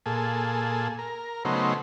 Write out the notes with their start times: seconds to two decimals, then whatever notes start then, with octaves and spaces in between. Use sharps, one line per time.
0.06 A#2 G#4 A4
0.99 A#4
1.45 C#3 F#3 A3 B3 D#4 C5